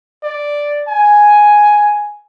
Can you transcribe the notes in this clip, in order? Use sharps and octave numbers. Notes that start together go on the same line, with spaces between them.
D5
G#5